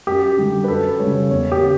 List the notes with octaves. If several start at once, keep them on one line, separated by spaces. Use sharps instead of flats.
F#2 G4
D3 G3
B4
F#2 A4
C#3 G3 C#5
E2 C#5
G4
C#3